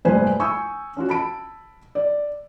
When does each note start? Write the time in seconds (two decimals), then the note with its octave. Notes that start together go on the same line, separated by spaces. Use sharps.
0.05 F1 A#1 G2 B4 C5 G#5
0.40 G#5 C#6 D#6 E6 G6
0.97 C#4 F4 F#4
1.09 A5 B5 D7
1.95 D5